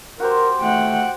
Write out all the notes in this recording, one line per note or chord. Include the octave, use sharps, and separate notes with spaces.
F#4 G4 A#4 C5
A3 F#5 G5